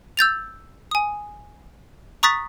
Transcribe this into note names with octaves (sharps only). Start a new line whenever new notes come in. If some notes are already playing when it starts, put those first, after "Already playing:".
E6 G6 A6 F7
G#5 D#6
A#5 C#6 D#6 F#6 A6 B6